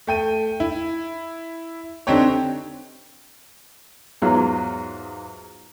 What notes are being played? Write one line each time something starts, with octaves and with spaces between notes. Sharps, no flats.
A3 G5 D#7
E4
D3 C4 D4 D#4 G4 C#5
E2 G#2 F#3 F4 F5